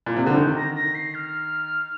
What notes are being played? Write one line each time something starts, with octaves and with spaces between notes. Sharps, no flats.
A#2
C3
D3
D#3 G6
A#6
A#6
C7
F6